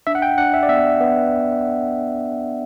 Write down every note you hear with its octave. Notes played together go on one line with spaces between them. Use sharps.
D4 E5
F#5
G5
D4 F#5
E5
D5
B3 E5
B3